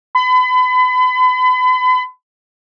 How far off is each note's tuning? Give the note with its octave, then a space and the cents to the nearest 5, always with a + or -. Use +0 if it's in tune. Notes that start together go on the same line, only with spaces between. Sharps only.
B5 +35